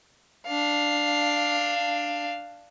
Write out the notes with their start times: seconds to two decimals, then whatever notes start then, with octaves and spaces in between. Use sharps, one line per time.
0.47 D4 F5